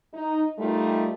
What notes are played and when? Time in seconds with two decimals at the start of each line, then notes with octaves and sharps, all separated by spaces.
0.14 D#4
0.58 G3 A3 A#3 D#4 F4